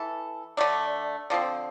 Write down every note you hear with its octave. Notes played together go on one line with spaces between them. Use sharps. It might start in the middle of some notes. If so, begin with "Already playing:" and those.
Already playing: E3 E4 A4
D3 A3 D4
D3 F3 C4